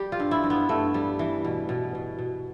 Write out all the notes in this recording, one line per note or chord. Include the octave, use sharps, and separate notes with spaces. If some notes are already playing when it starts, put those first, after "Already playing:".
Already playing: G3 G4
F4
G2
E4
G2
B3
G2 A3
G3
E3
B2
B2
B2
B2